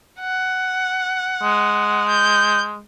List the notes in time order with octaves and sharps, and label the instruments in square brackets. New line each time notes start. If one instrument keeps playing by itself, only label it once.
[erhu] F#5
[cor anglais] G#3
[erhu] G6